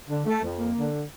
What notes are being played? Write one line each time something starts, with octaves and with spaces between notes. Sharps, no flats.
D3
A3
F2
A#3
D3